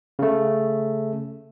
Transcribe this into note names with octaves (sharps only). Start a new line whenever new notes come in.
C#3 A3